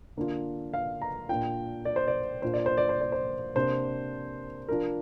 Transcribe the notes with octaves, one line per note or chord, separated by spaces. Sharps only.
D3 A#3 D4 F4
F5
A#5
A#2 A#3 D4 F4 G5
D5
C5
D5
A#2 A#3 D4 F4 C5
D5
C5
D5
C5
D5
C5
C3 A#3 D4 C5
F3 D4 F4 A#4